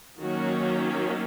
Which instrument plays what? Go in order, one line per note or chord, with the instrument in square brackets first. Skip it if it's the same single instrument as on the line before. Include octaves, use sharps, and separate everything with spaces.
[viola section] D#3 F#3 A#3 C#4 F#4